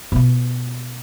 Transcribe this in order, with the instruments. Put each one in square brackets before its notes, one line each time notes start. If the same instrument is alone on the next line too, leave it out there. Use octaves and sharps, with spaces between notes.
[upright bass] B2 F4